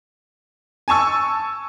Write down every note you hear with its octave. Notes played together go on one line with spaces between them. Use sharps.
G#5 A5 C#6 E6